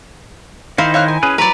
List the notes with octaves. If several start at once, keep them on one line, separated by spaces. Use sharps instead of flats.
D#3 D#4 E4 C5 F5
C#5 F5 F#6
G#5
C#4 G#4 B4
F#3 B4 D5 A#5 B5